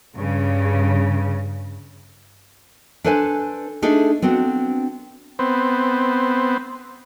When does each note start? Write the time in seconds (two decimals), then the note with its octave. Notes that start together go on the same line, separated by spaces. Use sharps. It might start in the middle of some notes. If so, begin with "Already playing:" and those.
0.17 G2 C#3
3.04 D4 A4 B4 C5 G5 G#5
3.82 A3 D4 D#4 G#4 A4
4.22 B3 C4 D4 F#4
5.39 B3 C4